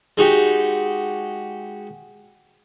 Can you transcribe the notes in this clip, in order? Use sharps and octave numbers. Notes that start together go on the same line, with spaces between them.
G#3 D#4 F#4 G4